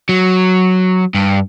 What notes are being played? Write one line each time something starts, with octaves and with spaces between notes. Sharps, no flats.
F#3
G2